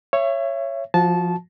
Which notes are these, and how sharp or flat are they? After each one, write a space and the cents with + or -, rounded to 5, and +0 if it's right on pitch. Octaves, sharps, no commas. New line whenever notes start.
C#5 -5 E5 +30
F3 +0 F#4 -25 A5 -15